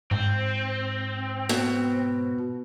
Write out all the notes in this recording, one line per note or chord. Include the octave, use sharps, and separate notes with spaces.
G#2 C4
B2